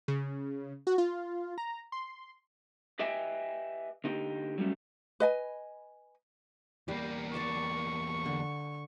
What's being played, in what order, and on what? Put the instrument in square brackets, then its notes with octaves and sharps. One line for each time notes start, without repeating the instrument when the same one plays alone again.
[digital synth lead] C#3
F#4
F4
A#5
C6
[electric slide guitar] G4 B4 D#5 E5 G5 G#5
D3 D#4 G4
F#3 G3 A3 C#4
[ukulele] B4 D#5 G#5
[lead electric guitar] E2 A#3 [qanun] G3 G4
[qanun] D5 A5 D6 [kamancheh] C#6
[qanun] D3